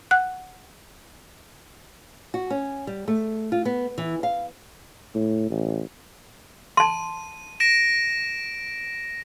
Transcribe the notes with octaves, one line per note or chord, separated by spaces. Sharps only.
F#5 F#6
F#4
C#4
G3
A3
F4
B3
E3
F5
A2
A1
A5 C6 D#7
A#6 D7 E7